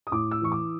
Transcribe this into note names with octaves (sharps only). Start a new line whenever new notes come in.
D#6
A2 D6
E6
E3 C#6
D6